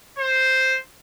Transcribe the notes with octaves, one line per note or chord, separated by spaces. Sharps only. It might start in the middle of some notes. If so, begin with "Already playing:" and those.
C5